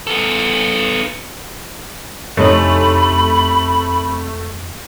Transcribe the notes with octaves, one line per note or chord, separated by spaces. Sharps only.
B3 A4
F2 C3 A3 C#4 D#4 B5